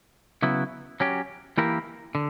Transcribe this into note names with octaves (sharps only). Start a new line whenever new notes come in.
C#3 F#3 B3 E4
F#3 C#4 G4
E3 A#3 E4 G4 A#4
D3